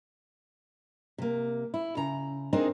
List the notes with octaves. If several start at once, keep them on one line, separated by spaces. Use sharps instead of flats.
C3 A#3
E4
C#3 A#5
C4 D4 D#4 G#4 A#4 C5